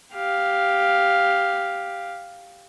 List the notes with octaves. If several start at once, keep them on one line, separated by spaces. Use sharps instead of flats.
G4 F5